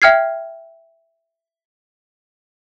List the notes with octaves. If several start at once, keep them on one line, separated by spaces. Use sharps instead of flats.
E5 G5 F6 G#6 C7